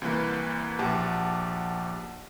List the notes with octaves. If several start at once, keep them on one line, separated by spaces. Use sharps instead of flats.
C2 E3 A#3 B4
A#1 G4 F#5 A5